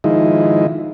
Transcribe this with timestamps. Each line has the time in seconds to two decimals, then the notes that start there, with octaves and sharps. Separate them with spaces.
0.04 D#3 F3 G#3 D#4 E4